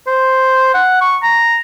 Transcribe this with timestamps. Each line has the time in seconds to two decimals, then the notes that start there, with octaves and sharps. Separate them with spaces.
0.07 C5
0.74 F#5
1.01 C#6
1.23 A#5